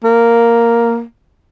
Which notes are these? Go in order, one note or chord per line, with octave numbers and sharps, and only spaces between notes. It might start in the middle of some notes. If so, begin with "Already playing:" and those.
A#3